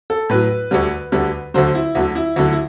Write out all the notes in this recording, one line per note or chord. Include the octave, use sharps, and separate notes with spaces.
A4
A2 F#3 B4
D2 D3 G3
D2 D3 G3
D2 D3 F#3 C5
E4
D2 D3 F#3
E4
D2 D3 F#3 E4
E4